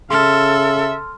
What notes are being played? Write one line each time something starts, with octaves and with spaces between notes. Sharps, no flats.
C#3 A4 E5 C6 F6